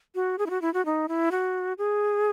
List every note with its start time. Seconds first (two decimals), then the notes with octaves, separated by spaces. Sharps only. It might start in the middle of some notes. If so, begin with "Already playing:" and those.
0.15 F#4
0.39 G#4
0.46 E4
0.50 F#4
0.62 E4
0.74 F#4
0.86 D#4
1.08 E4
1.31 F#4
1.78 G#4